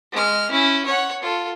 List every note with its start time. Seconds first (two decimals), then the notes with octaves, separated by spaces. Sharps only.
0.12 G#3 F6
0.51 C#4 E4
0.85 C#5 F#5
1.22 F4 A4